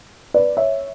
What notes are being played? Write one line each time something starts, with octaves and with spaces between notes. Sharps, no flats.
B4 D5
C#5 E5